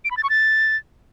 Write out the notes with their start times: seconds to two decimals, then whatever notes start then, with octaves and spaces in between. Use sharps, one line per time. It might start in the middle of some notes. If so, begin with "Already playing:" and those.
0.04 D7
0.11 B5
0.17 A6
0.23 C#6
0.30 A6